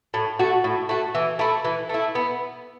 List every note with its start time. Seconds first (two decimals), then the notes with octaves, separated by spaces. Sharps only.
0.14 A2
0.39 A3 F#4
0.64 A2
0.89 A3 F#4
1.15 E3
1.39 A3 E4
1.65 E3
1.89 A3 E4
2.15 B3